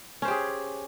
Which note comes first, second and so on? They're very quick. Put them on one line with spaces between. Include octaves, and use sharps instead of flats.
C#4 C5 G4 G#4